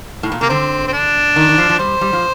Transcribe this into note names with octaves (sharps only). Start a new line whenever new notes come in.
A2
A#2
C3 A#3
D3 C4
C4
D4
D#3
D#3
F3
F3
G3 C5
G3
F3